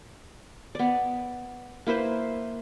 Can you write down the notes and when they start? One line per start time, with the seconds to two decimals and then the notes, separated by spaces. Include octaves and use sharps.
0.75 B3 D5
1.87 A#3 E4 B4 C5